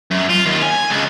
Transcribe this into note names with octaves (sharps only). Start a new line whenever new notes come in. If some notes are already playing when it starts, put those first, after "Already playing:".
F#2
F4
D#2
G#5
C#2